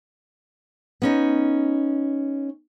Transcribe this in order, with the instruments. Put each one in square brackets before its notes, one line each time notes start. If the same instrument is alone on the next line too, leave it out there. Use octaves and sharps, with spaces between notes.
[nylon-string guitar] B3 C#4 D#4